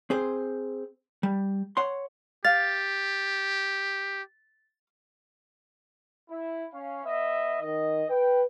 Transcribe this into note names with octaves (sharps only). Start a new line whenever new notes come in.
C4 G#4 C5
G3
C#5 F#5 C6
G4 F5 A6
E4
C#4 F5
B3 D#5 E5
D#3 D#5
B4 G5